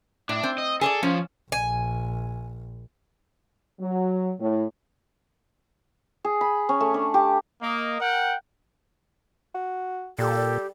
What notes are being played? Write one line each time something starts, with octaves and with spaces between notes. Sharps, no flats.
A2 D4
C4
D#5
G#4 A4 C#5 D5
F3 C#4
A#1 G#5
F#3
A2
G#4
B5
C#4
A3
D4
G4
A#3 D#5
A#4 F#5 G5
F#4
A#2 G3 G4 A4